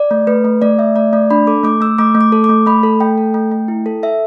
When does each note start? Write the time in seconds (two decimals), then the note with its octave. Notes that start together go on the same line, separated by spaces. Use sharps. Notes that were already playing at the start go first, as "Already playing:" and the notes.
Already playing: D5
0.11 A3
0.27 A3 B4
0.45 A3
0.62 A3 D5
0.78 A3 E5
0.96 A3 D5
1.13 A3 D5
1.31 D4 B5
1.47 A4 D6
1.64 A3 D6
1.81 A3 E6
1.98 A3 D6
2.15 A3
2.21 D6
2.32 A4
2.44 D6
2.49 A3
2.66 A3 B5
2.83 A4
3.00 A3 G5
3.18 A4
3.34 A3
3.51 A3
3.68 E4
3.86 A4
4.03 A4 E5